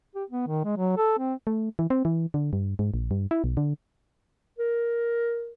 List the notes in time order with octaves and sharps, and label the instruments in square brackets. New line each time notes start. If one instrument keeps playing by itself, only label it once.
[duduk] G4
B3
D#3
G#3
F#3
A4
C4
[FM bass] A3
E3
C4
E3
D3
G2
G#2
A#1
G2
E4
B1
D3
[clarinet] A#4